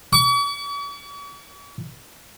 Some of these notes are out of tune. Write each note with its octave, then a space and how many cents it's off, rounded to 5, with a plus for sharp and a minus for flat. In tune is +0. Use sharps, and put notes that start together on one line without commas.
C#6 +45